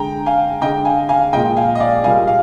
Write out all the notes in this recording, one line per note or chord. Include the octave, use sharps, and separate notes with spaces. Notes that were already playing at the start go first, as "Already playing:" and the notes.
Already playing: D3 G#3 G5 A#5
F5 G#5
D3 G#3 D#5 G5
F5 G#5
F5 G#5
A#2 F3 G#3 D#5 G5
F5 G#5
D#5
D5 F5
A#2 G3 A#3 F5 G#5
F5